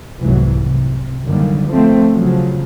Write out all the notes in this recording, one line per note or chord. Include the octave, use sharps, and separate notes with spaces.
F1 C2 G#2 E3 F#3
C3
F#2 D3 D#3 G3 A#3
F3 A3 C4
C#3 F3 F#3